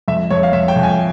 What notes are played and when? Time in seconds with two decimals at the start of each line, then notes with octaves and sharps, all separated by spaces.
0.08 F2 E5
0.30 F2 C#5
0.43 F5
0.53 F2 E5
0.68 G5
0.76 F2
0.83 G#5